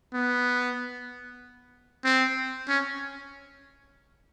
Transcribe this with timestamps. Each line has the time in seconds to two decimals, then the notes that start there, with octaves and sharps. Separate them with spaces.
0.14 B3
2.05 C4
2.69 C#4